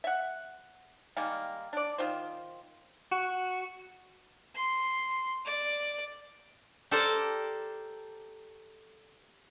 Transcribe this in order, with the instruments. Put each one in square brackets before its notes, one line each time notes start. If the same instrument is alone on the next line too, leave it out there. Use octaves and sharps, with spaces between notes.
[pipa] E5 F#5
D#3 G3 G#3 A#3
D4 D5
D#3 F4 C5
[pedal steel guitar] F#4
[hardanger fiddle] C6
D5
[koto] G4 A4 A#4 C5 D5 A5